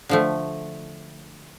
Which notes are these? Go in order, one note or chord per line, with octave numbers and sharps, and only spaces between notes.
D3 F3 A3